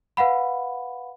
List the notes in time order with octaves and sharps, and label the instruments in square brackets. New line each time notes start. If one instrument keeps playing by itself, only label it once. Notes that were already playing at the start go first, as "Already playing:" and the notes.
[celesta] B4 F5 F#5 B5